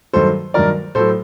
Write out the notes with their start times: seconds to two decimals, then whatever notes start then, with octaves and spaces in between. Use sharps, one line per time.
0.13 G2 D#3 F#3 A4 C5
0.54 G2 D#3 F#3 A#4 D5
0.95 A2 F#3 A4 C5